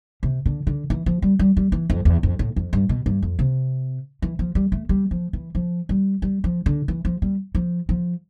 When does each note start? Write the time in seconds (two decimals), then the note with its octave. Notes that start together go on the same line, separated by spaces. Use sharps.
0.23 C3
0.46 D3
0.67 D3
0.90 E3
1.06 F3
1.22 G3
1.39 G3
1.57 G3
1.72 E3
1.90 F2
2.05 E2
2.23 F2
2.39 A2
2.56 F2
2.73 G2
2.89 B2
3.06 G2
3.22 F2
3.39 C3
4.22 E3
4.39 F3
4.55 G3
4.72 A3
4.89 G3
5.11 F3
5.33 E3
5.55 F3
5.89 G3
6.22 G3
6.44 F3
6.66 D3
6.88 E3
7.05 F3
7.22 G3
7.55 F3
7.89 F3